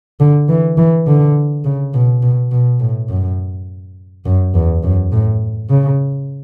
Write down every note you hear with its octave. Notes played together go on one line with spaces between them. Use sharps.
D3
E3
E3
D3
C#3
B2
B2
B2
A2
F#2
F#2
E2
F#2
A2
C#3